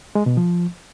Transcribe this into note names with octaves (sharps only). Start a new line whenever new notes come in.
G#3
B2
F3